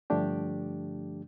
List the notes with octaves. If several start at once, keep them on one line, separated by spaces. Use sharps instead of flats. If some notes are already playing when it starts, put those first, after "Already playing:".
G2 D3 F3 A3 D4 G4